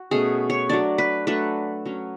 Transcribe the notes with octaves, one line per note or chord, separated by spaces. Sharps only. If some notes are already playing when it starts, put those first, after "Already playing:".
Already playing: F#4
B2 A3 C#4 G#4
C#5
F#3 A3 D4 D5
B4
F#3 A3 D4 B4
F#3 C#4